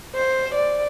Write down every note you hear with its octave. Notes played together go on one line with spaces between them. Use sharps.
C5
D5